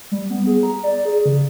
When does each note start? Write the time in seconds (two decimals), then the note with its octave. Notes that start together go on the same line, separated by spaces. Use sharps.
0.11 G3
0.30 B3
0.47 G#4
0.63 A#5
0.83 D5
1.05 G#4
1.26 C#3